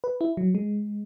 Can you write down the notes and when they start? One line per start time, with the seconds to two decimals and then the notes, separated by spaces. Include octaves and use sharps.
0.04 B4
0.21 E4
0.37 F#3
0.55 G#3